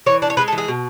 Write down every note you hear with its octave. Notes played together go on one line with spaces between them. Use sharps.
E3 C#5
D4
C#5
G#3 B4
A4
E3
G#4
B2